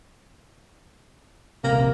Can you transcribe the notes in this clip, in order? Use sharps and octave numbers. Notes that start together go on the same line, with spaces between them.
D#1 A#1 C3 A#3